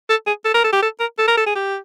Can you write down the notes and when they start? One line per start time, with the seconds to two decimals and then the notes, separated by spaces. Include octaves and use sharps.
0.09 A4
0.26 G#4
0.45 A4
0.54 A#4
0.64 A4
0.73 G4
0.82 A4
1.00 A#4
1.18 A4
1.27 A#4
1.37 A4
1.46 G#4
1.55 G4